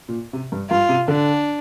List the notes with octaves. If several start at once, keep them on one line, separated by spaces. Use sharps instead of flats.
A#2
C3
G2
G2 F4
C3
D3 D4